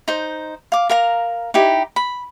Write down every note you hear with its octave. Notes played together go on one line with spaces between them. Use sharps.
D#4 C5
F5 D6
A#4 F5 A#5
D#4 E4 G4
B5